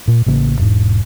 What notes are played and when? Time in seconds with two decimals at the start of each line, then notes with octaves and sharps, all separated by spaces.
0.08 A#2
0.26 A1 C#3 A#3
0.59 E1 G#2